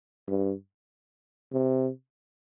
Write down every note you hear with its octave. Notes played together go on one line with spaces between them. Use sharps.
G2
C3